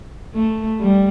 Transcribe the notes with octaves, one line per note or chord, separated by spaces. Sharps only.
A3
G3